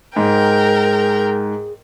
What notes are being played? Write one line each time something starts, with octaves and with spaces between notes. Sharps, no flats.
G#2 G#4 A#4 G5